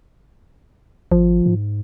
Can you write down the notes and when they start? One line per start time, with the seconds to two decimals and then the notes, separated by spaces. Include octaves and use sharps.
1.12 G#1 F3
1.46 G#2